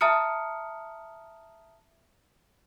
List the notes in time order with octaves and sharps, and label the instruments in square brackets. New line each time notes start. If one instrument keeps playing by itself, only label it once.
[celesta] E5 A5 A#5 D#6 F6 C#7